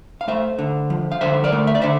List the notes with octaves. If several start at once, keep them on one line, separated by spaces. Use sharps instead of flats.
F5
A3 C5 E5
D3
F3
F5
D3 C5 E5
A#4 D5
A3
E5
D5
D3 C5 E5